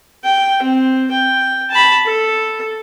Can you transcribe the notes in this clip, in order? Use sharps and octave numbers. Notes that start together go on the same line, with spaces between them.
G5
C4
G5
A5 B5
A4